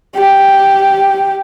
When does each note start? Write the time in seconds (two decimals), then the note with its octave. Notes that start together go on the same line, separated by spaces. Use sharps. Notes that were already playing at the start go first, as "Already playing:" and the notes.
0.15 G4